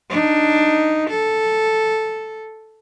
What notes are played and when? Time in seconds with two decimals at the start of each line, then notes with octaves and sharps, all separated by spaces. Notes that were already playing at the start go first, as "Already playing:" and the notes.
0.10 D4 D#4
1.10 A4